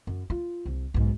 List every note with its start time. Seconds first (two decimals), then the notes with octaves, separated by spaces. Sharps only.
0.07 F#2
0.30 F4
0.65 C2
0.94 B1 G#2